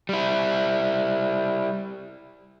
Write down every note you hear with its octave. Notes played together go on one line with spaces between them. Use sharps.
G3 E4